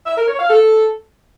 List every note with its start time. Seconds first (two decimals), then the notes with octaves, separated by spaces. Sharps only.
0.06 E5
0.17 A#4
0.28 C#5
0.39 F5
0.50 A4